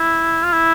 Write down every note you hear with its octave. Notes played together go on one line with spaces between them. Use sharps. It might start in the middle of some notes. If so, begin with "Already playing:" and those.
Already playing: E4
F4
E4